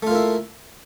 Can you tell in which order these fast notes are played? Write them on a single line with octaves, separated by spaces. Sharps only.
A3 F4 A#3 E4